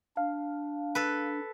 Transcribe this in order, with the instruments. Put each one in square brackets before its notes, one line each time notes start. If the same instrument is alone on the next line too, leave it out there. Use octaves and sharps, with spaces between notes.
[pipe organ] D4 [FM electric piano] F5
[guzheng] A4 B4